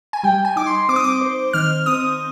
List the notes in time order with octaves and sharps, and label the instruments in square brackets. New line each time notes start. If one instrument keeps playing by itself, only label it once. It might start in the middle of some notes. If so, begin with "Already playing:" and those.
[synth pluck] G#5
[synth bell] G3 [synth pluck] G5
[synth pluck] G#5
[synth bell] D#4 [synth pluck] D6
[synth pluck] C6
[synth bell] C4 [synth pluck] D6
[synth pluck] D#6
D6
[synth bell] C5
[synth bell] D#3 [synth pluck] F6
[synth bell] C4 [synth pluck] D#6